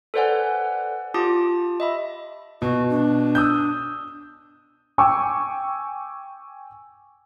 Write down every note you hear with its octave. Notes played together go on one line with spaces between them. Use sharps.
A4 B4 C5 D5 F#5 G#5
F4 G4 A5 D6 D#6
D#5 E5 B5
B2 F#4
D4
D#6 E6 G6
G5 G#5 C#6 D6 E6